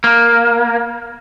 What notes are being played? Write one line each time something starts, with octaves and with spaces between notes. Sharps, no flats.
A#3